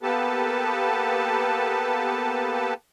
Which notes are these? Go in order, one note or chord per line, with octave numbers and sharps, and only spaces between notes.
A#3 B3 G4 A4 B4 A5